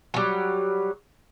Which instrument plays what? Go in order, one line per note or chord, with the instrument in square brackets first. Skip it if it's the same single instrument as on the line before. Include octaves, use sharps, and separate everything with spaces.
[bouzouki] F#3 G3